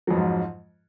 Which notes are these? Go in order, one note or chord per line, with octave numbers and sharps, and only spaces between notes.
F2 G#2 F3 F#3